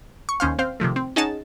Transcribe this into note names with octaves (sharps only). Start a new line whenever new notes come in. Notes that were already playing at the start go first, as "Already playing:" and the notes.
C#6
D#2 C#4 C5 F5
C4 C5 F5
C3 D#3 F3 A3
C4
C#4 D#4 G#4 D#5 F#5 A5